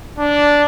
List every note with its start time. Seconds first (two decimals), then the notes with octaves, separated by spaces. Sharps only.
0.19 D4